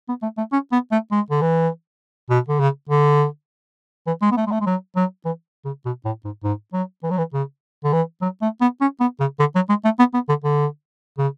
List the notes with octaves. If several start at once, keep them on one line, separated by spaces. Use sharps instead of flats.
B3
A3
A3
C#4
B3
A3
G#3
D3
E3
B2
D3
C#3
D3
E3
G#3
B3
A3
G#3
A3
G#3
F#3
F#3
E3
C#3
B2
A2
G#2
G#2
F#3
E3
F#3
E3
C#3
D3
E3
F#3
A3
B3
C#4
B3
C#3
D3
F#3
G#3
A3
B3
B3
D3
D3
C#3